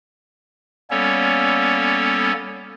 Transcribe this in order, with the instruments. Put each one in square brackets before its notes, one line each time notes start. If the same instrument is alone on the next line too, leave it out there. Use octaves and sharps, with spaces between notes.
[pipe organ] G3 A#3 B3 C#4 A4 C#5